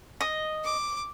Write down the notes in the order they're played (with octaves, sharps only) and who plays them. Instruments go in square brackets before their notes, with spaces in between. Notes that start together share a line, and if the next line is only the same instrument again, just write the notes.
[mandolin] D#5
[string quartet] D6